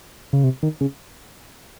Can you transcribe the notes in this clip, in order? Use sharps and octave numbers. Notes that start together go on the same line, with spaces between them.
C#3
C3
D#3
C#3